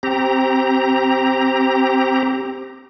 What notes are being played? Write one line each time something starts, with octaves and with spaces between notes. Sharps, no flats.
C4 G4 A#5